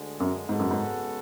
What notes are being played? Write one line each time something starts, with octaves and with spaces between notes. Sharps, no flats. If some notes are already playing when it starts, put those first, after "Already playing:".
Already playing: D2 D3 G#3
F#2
G#2 C#3 G#3 B3 F#4 A4
F#2
G#2